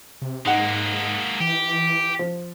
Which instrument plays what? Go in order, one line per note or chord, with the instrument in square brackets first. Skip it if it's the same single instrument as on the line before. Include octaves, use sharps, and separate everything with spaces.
[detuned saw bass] C3
[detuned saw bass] G#2 [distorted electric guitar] G#3 A#3 [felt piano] D#4 F#5
[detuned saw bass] E3 [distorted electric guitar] G4
[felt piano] F3